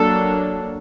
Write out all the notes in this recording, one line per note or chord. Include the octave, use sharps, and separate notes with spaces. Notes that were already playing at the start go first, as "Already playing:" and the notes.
Already playing: F#3 A#3 D4 A4